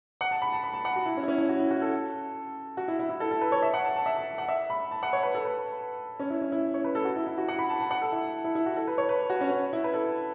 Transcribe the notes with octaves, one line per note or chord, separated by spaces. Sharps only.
F#5
A5
B5
A5
B5
A5
F#5
F#4
E4
C#4
E4
C#4
E4
F#4
E4
F#4
A4
F#4
E4
E4
E4
A4
A4
B4
C#5
E5
F#5
A5
A5
E5
A5
F#5
E5
B5
A5
F#5
C#5
B4
A4
B4
C#4
E4
C#4
E4
C#5
B4
A4
F#4
E4
E4
F#4
F#5
B5
A5
A5
F#5
A4
E4
E4
E4
F#4
A4
B4
C#5
B4
F#4
C#4
C#4
E4
B4
A4